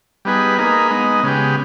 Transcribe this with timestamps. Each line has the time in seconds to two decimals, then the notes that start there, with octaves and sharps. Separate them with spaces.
0.25 G3 B3 D#4 G#4 B4
0.58 A#3 D#4 G#4 B4
0.91 G#3 B3 D#4
1.23 C#3 G#3 B3 G4